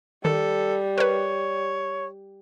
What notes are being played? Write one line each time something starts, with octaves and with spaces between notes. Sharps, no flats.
D#3 G3 A4
A#4 B4 C#5